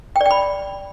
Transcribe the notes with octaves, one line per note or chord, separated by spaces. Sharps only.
G5
D5
G5
B5